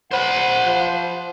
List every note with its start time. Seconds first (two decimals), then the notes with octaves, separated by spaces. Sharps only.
0.11 C5 F#5 B5
0.64 F3